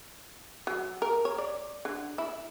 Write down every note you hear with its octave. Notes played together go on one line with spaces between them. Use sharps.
F#3
A#4
C#5
D5
D3
E4